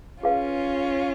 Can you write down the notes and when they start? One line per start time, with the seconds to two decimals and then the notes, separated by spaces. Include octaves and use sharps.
0.23 C#4 F4 G#4 B4 F5